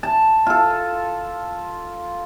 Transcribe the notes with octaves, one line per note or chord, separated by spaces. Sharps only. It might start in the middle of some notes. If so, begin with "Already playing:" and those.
A5
F4 A4